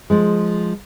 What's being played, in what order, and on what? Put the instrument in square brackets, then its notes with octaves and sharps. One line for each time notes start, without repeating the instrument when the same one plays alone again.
[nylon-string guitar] F3 G#3